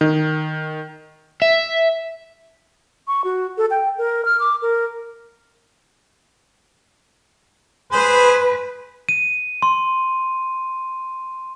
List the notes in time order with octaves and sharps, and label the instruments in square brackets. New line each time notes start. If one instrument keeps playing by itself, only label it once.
[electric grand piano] D#3
[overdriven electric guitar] E5
[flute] C#6
F#4
A4
G5
A#4
F6
D6
A#4
[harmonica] G#4 C5 [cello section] B4
[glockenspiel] D#7
C6